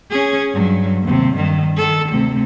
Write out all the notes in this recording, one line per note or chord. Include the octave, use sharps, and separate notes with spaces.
C#4 G#4
G2 F#3
D#2 C3
G2 D#3
D#3 A4
D2 C3